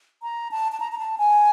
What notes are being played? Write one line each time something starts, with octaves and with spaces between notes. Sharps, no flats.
A#5
A5
A5
A#5
A#5
A5
G#5